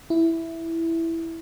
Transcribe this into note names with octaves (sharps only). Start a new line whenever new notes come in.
E4